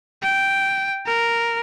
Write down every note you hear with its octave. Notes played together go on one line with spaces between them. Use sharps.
G5
A#4